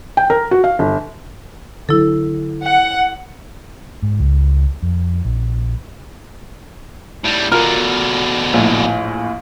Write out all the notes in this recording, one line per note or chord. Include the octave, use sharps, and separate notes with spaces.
G5
A#4
F#4
F5
G1
D3 F#3 E4 A4
F#5
G#2
C#2
F2
A#1
A2 G3
B2 D3 F4 A#4 F6
A#1 A2